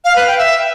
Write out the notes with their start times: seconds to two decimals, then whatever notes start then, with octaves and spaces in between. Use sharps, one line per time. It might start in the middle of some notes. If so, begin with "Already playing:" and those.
0.05 F5
0.16 B4
0.27 G5
0.38 E5